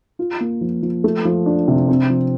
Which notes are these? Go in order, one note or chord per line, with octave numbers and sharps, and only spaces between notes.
F4
A#3
F3
F3
A3
F3
D4
C3
C4
F3